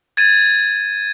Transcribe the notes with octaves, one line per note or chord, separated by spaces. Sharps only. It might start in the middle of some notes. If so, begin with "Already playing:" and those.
G#6 A6 D#7